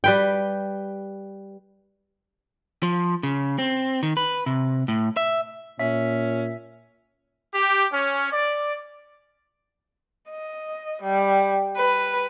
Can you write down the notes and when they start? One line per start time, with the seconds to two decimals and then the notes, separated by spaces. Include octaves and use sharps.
0.04 G3 B4 G5
2.83 F3
3.23 C#3
3.59 C4
4.03 D#3
4.17 B4
4.46 C3
4.88 A2
5.17 E5
5.79 A#2 C#4 E5
7.54 G4
7.91 C#4
8.31 D5
10.30 D#5
11.03 G3
11.77 B4